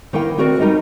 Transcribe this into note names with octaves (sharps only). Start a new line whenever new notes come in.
D#3 A#3 E4 A#4 G5
A3 C4 F#4 A#4 C5 D5
G3 C#4 D#4 G4 A#4 D#5